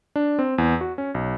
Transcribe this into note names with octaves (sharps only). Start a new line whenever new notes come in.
D4
C4
E2
F#4
C#4
B1